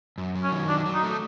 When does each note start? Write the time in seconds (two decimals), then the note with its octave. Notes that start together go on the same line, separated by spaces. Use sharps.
0.18 F#2
0.35 F#3
0.43 C#4
0.52 D#3
0.68 F#3 D4
0.86 F#3
0.94 D#4
1.03 A3